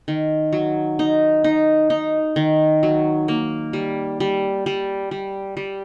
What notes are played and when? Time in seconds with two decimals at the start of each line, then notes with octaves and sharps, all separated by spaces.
0.08 D#3
0.53 F#3
0.99 D#4
1.44 D#4
1.90 D#4
2.36 D#3
2.83 F#3
3.28 A#3
3.73 G3
4.20 G3
4.66 G3
5.11 G3
5.57 G3